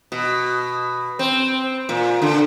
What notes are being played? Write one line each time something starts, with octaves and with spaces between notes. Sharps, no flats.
B2
C4
A#2
D3